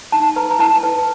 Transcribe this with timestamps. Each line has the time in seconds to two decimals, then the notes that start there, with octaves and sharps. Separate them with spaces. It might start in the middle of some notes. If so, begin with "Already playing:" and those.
0.12 D#4 A5
0.36 B4 A#5
0.51 A#5
0.59 E4 A5
0.83 B4